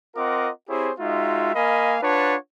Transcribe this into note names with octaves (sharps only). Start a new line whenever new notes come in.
C4 F4 A#4 D#5 F#5 D6
C4 E4 G4 G#4 C5 C#5
G#3 D#4 F4 F#4 E5
A#3 A#4 D#5 F5 G#5 B5
D4 F4 B4 C#5 F#5 A5